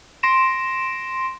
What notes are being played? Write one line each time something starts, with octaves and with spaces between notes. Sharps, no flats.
C6 A#6 D7 E7